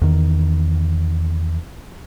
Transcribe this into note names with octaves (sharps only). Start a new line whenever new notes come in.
E2 D#3